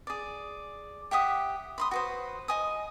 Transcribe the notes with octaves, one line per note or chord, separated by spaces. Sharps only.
G#4 D5
G4 E5 F#5 D#6
B5 C6 D#6
F#4 B4 C5
D#5 G#5 D#6